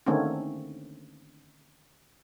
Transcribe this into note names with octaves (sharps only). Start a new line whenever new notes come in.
D3 D#3 A3 A#3 C4 C#4